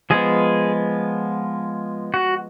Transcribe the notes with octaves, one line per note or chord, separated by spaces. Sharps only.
F3 G#3 B3 G#4
F#4